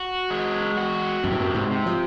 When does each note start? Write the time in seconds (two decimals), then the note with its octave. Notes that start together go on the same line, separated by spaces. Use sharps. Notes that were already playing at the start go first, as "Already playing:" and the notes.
Already playing: F#4
0.30 G#3
0.77 F#4
1.23 F#2 C3
1.32 G#2
1.40 F#2
1.55 G#2
1.71 C3
1.86 F3